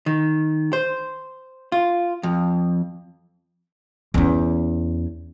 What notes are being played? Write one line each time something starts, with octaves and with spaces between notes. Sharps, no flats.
D#3
C5
F4
F2
E2 C#4